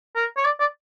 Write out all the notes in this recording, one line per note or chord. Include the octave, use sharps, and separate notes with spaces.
A#4
C#5
D5
D5